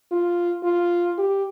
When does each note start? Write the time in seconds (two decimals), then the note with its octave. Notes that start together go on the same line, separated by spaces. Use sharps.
0.12 F4
0.63 F4
1.18 G4